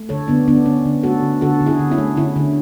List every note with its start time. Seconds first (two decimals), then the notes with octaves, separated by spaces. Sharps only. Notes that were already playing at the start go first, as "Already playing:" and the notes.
Already playing: A3
0.09 D3 A4 C#5
0.28 D3 B3 D4
0.48 D3 B3 D4
0.66 D3 C#4
0.85 D3
1.03 A3 F#4 A4
1.23 D3
1.41 D3 F#4 A4
1.61 D3
1.66 E4 G#4
1.79 D3
1.91 C#4 E4
1.98 A3
2.17 D3 C#4 E4
2.36 D3